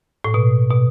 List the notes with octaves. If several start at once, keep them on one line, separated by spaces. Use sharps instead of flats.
A2
B2
B2